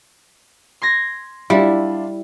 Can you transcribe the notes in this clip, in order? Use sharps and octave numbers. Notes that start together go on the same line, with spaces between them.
C6 G#6 A#6
G3 D4 E4 F4